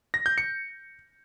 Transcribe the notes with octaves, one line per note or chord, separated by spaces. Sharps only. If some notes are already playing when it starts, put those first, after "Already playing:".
A#6
G6
C#7